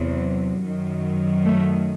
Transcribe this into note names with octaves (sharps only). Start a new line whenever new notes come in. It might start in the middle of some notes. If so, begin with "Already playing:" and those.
Already playing: E2 C3 F#3
F#2 D#3 F#3
A3